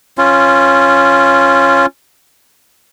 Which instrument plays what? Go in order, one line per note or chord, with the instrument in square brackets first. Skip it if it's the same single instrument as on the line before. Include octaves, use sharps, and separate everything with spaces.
[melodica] C#4 F4